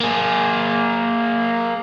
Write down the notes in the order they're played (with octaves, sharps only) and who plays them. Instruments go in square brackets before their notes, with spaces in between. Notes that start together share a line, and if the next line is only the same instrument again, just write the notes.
[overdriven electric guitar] A#3 G#4